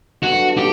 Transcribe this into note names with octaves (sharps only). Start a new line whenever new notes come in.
G2 F#3 B3 D4 F#4 A4
G4